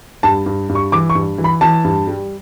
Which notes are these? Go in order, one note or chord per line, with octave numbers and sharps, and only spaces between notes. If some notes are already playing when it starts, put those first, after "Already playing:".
G2 A5
G2
G2
C#6
E3 D6
C#6
G2
E3
B5
E3 A5
G2
G3